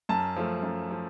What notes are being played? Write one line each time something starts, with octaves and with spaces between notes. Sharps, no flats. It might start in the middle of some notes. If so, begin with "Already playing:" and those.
F#2 A5
F3 A3
F#2
F3